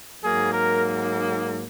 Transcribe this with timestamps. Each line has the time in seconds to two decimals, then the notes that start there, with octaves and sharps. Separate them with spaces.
0.24 G#2 F#3 A#3 G#4
0.54 A#4